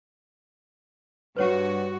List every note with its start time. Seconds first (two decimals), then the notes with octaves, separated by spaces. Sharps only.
1.37 G2 F#4 B4 C#5 F#5